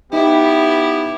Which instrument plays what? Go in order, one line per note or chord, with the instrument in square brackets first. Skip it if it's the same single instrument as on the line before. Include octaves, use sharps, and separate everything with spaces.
[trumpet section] B3 G4 [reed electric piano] D#4 [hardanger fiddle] E4